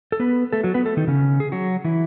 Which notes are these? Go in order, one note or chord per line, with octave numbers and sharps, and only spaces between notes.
A4
B3 B4
A3 A4
F#3 F#4
B3 B4
A3 A4
D#3 D#4
C#3 C#4
G#4
F#3 F#4
E3 E4